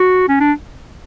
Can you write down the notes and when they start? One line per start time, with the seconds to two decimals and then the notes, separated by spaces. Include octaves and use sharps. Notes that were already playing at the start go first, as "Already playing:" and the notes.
Already playing: F#4
0.29 C#4
0.40 D4